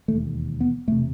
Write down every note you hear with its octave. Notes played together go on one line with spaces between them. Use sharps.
E1 D#2 A3
B3
E1 C3 A3